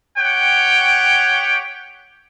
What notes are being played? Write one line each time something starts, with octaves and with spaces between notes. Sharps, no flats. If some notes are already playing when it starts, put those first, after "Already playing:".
G4 C#5 F#5 G5